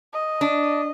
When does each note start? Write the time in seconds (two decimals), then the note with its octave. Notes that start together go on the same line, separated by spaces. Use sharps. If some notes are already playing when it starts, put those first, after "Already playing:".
0.13 D#5
0.41 D4